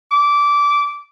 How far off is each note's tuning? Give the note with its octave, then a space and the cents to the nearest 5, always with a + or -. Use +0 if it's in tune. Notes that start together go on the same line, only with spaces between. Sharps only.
D6 -15